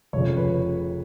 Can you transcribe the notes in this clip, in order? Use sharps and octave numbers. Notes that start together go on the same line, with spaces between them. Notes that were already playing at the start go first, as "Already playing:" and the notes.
F1 F2 C#3 C#5
B4